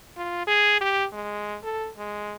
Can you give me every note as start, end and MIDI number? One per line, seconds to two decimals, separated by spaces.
0.17 0.43 65
0.47 0.81 68
0.81 1.05 67
1.13 1.57 56
1.64 1.89 69
1.97 2.36 56